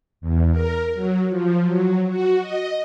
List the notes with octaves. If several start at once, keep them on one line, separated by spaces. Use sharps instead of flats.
E2
A#4
F#3
F3
F#3
F#4
D#5